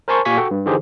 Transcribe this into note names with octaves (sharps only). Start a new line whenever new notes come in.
A#4 C5 G#5 A5 C6 C#6
A#2 G4 F5 G#5 C#6 B6
F#4 A4 F#5 G5
G2
D3 E3 D#4 G4 G#4 C5